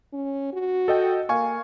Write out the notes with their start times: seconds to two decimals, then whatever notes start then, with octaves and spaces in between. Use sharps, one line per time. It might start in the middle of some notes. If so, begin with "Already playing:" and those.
0.13 C#4
0.53 F#4
0.88 A4 D#5 G5
1.29 A#3 F5 G#5 C#6